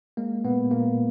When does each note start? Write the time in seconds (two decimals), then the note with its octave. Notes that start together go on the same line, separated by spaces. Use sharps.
0.17 G#3 A#3
0.45 A#2 B3
0.71 A#2 A#3